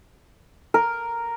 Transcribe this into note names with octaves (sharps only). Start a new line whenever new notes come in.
A#4